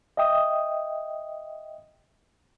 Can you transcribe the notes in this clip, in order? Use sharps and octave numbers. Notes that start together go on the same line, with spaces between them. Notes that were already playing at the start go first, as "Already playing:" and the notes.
D#5 E5 G5 D#6